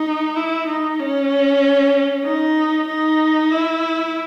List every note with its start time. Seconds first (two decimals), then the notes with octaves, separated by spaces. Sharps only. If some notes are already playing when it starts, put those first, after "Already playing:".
Already playing: D#4
0.36 E4
0.68 D#4
0.99 C#4
2.25 D#4
2.88 D#4
3.51 E4